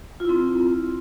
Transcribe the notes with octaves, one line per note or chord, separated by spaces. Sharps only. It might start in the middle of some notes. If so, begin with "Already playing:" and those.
C4 E4 F4